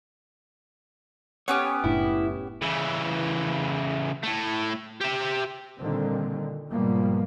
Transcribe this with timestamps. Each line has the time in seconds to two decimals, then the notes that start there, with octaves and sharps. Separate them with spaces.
1.48 B3 C#4 G4 C#5
1.84 F#1 A2 D4 E4
2.62 C#3 E3
4.23 A2 A3
5.01 G4 E5
5.78 A#2 D3 D#3 G3 C4
6.70 G#2 B2 F3 G3 A#3 B3